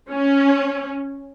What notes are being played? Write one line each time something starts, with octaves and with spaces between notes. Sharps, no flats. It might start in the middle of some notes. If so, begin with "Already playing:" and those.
C#4